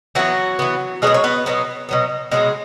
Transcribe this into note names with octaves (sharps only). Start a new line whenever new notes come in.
E3 F#3 B3 F#4
E3 B3
B2 F#3 G#3 B3 G#4
C#5
B3 B4
B2 F#3 B3
B2 F#3 B3
B2 F#3 G#3 B3 G#4